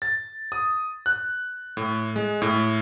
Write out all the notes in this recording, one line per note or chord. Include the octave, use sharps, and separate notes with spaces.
A6
D#6
F#6
A2
G#3
A2